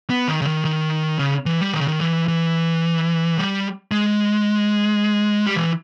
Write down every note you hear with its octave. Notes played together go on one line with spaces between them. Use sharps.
B3
D#3
C#3
D#3
D#3
C#3
E3
G3
D#3
C#3
D#3
E3
E3
G3
G#3
G3
E3